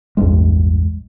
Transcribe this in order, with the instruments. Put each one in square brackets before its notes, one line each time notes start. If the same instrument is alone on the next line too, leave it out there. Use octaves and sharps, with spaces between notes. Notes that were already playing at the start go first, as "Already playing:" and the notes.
[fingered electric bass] A1 E2 G2 G#3